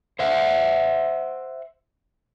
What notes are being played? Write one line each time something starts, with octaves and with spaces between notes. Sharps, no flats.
C5 E5 F#5